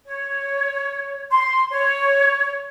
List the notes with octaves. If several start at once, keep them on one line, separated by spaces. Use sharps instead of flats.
C#5
C6
C#5